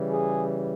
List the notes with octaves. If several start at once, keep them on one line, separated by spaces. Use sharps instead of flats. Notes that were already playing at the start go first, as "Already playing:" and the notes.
Already playing: C#3 E3 G3
G#4